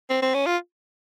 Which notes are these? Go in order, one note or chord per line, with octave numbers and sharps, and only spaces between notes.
C4
C4
C#4
F4